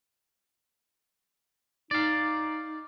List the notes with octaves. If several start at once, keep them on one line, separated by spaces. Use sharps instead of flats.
D#4 D5 F5